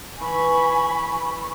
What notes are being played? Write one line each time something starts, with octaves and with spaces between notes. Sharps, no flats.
E3 G#5 B5 C#6